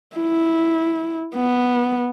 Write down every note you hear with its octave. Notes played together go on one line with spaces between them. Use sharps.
E4
B3